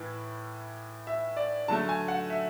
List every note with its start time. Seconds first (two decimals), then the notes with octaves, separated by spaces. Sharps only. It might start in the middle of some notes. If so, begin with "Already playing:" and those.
Already playing: A2 E3 B4
1.07 E5
1.37 D5
1.68 D3 F#3 A3 A5
1.89 G#5
2.08 F#5
2.30 E5